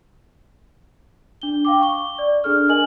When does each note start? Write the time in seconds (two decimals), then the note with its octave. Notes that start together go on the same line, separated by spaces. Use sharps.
1.42 D4 G7
1.65 F5 G5 D6
1.81 C#6 G7
2.19 D5
2.44 D4 G#4 A4 F6
2.69 A#4 D#5 G#5 F#7